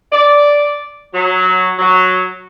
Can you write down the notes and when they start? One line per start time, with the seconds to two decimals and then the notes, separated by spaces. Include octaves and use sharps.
0.12 D5
1.14 F#3
1.79 F#3